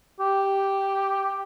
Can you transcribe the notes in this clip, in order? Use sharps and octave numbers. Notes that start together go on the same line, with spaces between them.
G4